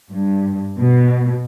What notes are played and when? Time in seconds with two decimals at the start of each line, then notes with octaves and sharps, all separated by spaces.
0.11 G2
0.78 B2